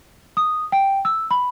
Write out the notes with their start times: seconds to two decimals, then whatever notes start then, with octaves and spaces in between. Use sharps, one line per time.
0.37 D#6
0.72 G5
1.05 E6
1.31 B5